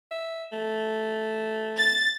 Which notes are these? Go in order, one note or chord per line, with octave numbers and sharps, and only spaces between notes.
E5
A3
A6